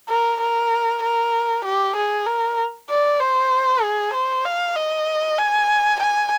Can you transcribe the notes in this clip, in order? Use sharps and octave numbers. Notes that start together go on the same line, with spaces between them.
A#4
A#4
A#4
G4
G#4
A#4
D5
C5
G#4
C5
F5
D#5
G#5
G#5